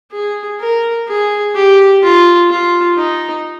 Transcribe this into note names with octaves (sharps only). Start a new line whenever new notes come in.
G#4
A#4
G#4
G4
F4
F4
D#4